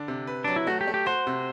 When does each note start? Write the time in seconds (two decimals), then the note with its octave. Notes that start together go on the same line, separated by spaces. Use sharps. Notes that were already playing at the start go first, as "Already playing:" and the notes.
Already playing: D3 D4
0.08 C3
0.27 B4
0.44 F#3 D4
0.56 E4
0.67 A3 F#4
0.81 G4
0.87 A3
0.94 G4
1.06 F#4 C5
1.27 C3